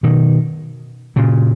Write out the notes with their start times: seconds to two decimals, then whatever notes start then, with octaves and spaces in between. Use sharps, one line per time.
0.03 B2 D#3
1.16 A#2 C#3